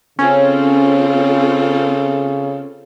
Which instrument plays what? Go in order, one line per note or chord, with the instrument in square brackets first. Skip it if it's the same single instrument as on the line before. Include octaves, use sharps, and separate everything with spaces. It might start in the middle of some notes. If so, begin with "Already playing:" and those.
[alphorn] C#3 [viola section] C4 F4 A4 [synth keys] C#4